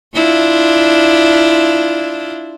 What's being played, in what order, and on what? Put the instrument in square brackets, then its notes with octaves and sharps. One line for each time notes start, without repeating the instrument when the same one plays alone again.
[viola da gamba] D4 E4 F4